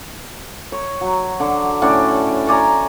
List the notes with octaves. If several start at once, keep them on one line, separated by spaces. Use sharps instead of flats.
C#5
F#3
D3
A2 C#4 D4 F#5
C#5 D5 G#5 A#5